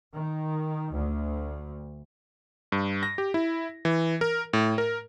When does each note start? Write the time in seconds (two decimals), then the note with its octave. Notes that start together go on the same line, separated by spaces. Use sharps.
0.14 D#3
0.92 D2
2.72 G2
3.03 A#6
3.18 G4
3.34 E4
3.85 E3
4.21 A#4
4.53 A2
4.78 A#4